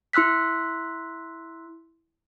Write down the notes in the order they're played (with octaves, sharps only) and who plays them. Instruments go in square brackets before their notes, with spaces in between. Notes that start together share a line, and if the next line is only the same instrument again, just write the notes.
[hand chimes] E4 C6 E6 F#6 B6